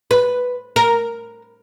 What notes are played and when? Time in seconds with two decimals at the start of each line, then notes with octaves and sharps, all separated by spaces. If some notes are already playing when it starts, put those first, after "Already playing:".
0.11 B4
0.76 A#4